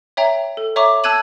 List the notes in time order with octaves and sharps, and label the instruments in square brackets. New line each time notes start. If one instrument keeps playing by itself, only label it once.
[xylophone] C#5 E5 G5 A#5
A4
C#5 E5 A#5 C#6 D6
A5 E6 F#6 G#6 D#7 F#7